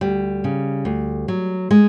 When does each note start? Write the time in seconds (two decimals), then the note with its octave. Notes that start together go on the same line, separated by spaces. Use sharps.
0.01 D2 G3
0.44 C#3
0.85 D2
1.28 F#3
1.71 G#3